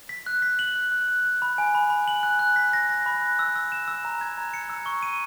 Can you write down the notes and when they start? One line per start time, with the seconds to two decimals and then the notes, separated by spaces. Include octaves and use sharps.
0.09 B6
0.26 F#6
0.42 B6
0.59 F#7
0.75 F#6
0.92 F#6
1.08 F#6
1.25 F#6
1.42 B5
1.58 G#5
1.75 B5
1.90 B5
2.08 F#7
2.23 F#6
2.39 F#6
2.56 B6
2.73 A#6
2.89 A#6
3.06 B5
3.22 F#6
3.39 E6
3.56 E6
3.72 E7
3.88 E6
4.05 A#5
4.21 G#6
4.38 A#5
4.54 C#7
4.70 E6
4.86 C#6
5.03 D#7